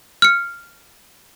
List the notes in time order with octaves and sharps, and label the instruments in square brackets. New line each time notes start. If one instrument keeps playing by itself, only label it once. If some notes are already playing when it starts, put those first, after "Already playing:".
[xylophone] F6 C#7